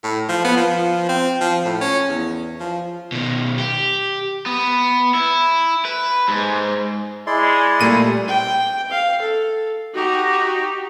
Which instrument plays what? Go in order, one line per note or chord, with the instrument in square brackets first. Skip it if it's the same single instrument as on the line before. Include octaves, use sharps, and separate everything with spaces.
[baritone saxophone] A2
F3
B3
F3
C4
F3
A2
C#4
E2
F3
[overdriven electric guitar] B2 D#3
G4
B3
E4
B4
G#2
[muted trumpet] G#3 [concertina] E4 D5 C6
[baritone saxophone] A#2 [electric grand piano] G3 A3 D#7
[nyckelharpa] G5
F5
A4
[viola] D#4 G4 [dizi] F#4